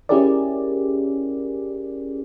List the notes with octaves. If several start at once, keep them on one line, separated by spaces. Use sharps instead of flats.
C#4 E4 G4 G#4 A#4 D5